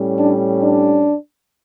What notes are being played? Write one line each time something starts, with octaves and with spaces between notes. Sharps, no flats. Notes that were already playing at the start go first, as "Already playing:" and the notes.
Already playing: A2 G3 C#4
D4
D4